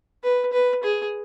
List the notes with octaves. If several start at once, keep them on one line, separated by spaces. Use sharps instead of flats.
B4
B4
G#4